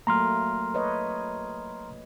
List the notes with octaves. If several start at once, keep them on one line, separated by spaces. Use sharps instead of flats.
F#3 A3 A#3 A#5 C6 F6
B4 C#5 D#5